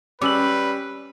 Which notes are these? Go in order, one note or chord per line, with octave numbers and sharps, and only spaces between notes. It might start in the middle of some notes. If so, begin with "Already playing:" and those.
G3 C#4 B4 D6 E6 F#7